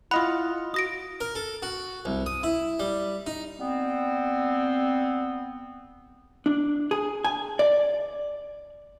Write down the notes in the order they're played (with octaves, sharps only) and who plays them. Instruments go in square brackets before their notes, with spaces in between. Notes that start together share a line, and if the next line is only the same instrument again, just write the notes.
[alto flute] E4 [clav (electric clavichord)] F4 D#5 F#5 [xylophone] B5
[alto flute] F#4 [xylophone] D#6 A#6 D7
[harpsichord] A#4
A4
F#4
C2
D#6
E4
G3
D#4
[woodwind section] G3 B3 C4
[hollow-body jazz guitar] D4
G#4
G#5
D5